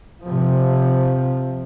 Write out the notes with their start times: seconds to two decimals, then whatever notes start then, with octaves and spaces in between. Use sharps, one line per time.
0.23 C3 F3